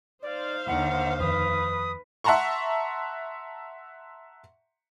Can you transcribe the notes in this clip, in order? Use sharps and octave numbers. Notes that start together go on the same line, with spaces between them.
D#4 C5 D5 F5
D#2 D3 F#5
F2 D#3 B4 D#6
E5 F#5 A5 A#5 C6 C#6